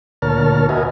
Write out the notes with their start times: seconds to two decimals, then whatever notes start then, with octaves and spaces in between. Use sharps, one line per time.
0.22 D2 A#2 A#4 C#5 A5 F6
0.69 F#4 A#4 B4 D#5 E5 G#5